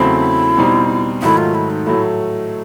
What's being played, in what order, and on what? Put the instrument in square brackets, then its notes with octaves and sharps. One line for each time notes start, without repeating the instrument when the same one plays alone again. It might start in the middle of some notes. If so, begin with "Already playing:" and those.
Already playing: [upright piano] E2 C#3 F#3 A3 C4 [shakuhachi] E4
[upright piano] B2 G3 C4 D#4
[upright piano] G#2 D#3 F#3 A3 [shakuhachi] E4
[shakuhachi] F4
E4
D#4
[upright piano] A2 F#3 A3 [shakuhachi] E4